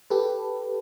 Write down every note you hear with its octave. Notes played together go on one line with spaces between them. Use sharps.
G4 A4 B4